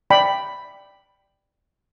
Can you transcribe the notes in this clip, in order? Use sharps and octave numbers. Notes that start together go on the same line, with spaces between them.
D5 G5 B5